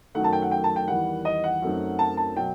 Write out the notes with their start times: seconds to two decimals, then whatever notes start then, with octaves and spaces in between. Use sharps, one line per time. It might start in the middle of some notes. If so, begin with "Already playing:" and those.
0.15 F#2 D#3 F#3 A3 D#4 F#5
0.24 A5
0.33 G5
0.42 F#5
0.51 G5
0.64 A5
0.76 G5
0.88 E2 D#3 G3 F#5
1.25 D#5
1.44 F#5
1.62 F#2 F#3 A3 C4 D#4
1.99 A5
2.17 A5
2.36 B2 F#3 G5